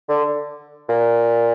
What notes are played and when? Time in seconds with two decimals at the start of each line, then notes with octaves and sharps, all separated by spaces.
0.09 D3
0.89 A#2